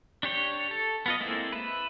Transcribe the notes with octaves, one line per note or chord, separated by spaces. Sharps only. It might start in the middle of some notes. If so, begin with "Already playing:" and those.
D4 G4 C#5 G5
A4
B3 F4 D#5
G#3 A#3 C4 E4 A4
B4 E5